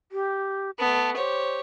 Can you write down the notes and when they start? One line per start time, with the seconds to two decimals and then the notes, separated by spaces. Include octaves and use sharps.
0.12 G4
0.79 A3 B3 A5
1.16 G4 C5 C#5